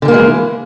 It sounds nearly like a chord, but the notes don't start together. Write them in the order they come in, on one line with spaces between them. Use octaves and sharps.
D3 G3 A#3 G#3 E3